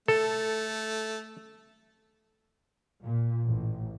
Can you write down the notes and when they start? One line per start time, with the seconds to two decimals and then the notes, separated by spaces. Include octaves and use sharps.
0.08 A3 A4
3.02 A#2
3.46 A1